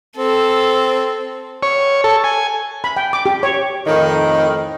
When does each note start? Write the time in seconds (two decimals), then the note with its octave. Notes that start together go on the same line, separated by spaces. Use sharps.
0.17 C4 A4
1.63 C#5
2.04 A4
2.24 G#5
2.84 B5
2.96 G5
3.13 D6
3.26 G4
3.43 C#5
3.87 F2 A2 D#3